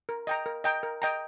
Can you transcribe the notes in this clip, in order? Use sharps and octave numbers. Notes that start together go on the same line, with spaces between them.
A#4
D#5 G5 A#5
A#4
D#5 G5 A#5
A#4
D#5 G5 A#5